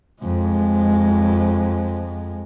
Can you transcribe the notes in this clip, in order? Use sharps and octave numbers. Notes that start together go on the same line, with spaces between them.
F2 G#3